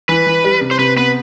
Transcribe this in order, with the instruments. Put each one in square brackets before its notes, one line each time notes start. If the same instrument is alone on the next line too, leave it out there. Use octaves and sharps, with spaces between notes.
[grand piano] E3 [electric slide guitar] B4
[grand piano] E3
G3
C3
[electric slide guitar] C5
[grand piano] C3 [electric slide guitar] B4
[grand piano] B3 [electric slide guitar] B4